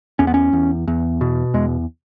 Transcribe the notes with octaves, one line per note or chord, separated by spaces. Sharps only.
E2 C#4
B3
C#4
E2
E2
B2
E2 G#3